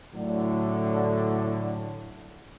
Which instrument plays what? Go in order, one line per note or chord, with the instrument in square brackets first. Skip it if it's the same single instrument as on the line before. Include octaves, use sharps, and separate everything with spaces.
[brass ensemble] A2 D3 F#3